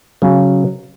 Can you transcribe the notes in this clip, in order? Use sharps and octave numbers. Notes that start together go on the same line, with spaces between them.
C#3 F#3